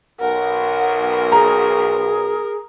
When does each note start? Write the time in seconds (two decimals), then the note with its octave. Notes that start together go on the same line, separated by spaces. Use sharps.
0.20 B1 A#4 F#5
1.32 G#4 A#5